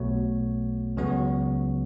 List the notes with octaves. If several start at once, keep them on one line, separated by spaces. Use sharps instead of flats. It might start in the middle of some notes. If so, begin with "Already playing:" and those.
Already playing: B1 B2 A3 F#4 C#5
C#2 C#3 F#3 B3 F#4